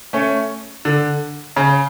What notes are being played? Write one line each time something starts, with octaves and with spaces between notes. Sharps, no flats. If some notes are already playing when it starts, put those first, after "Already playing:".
A3 C#4
D3
C#3